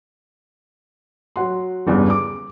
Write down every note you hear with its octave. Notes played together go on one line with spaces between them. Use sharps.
F#3 F#5 C6
G1 E2 G2 C#3
D6